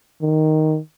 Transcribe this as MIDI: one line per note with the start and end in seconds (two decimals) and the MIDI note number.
0.22 0.79 51